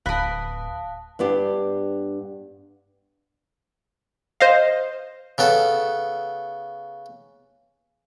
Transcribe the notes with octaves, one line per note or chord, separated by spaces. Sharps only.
D1 B4 F5 A5 D#6
G2 B3 D4 G4
C5 D#5 F5
C#3 B3 A4